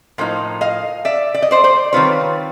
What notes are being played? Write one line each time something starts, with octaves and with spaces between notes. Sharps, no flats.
A2 F3 A#3 D#4
D#5 F5
D5 E5
D5
D#5
C5 D5
C5 D5
D#3 G3 C4 F4 B4 C#5